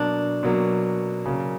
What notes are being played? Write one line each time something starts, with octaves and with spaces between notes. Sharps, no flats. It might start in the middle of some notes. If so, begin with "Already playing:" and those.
Already playing: B2 F#3 A#3 D4
B2 F#3 A#3
C#3 F#3 A#3